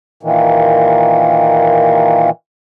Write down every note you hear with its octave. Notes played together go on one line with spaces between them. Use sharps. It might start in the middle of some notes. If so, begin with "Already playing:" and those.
A#2 D#3 E3